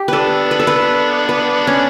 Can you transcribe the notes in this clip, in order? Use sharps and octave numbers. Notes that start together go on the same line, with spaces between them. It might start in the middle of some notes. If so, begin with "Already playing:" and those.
Already playing: G4
B3 D4 A4 B4
B4
A4
B4
B4
C#4